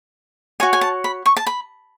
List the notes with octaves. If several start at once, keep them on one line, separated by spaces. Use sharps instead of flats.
F#4 C#5 G#5
G#5
A5
B5
C#6
A5
B5